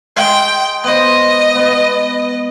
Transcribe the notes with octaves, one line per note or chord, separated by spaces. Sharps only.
G#3 G5
B3 C5 D#5
B3 B4